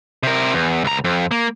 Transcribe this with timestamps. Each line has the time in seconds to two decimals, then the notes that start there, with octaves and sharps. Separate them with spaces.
0.23 C3 A#4
0.54 E2
0.84 C#2 A#5
1.04 F2
1.31 A#3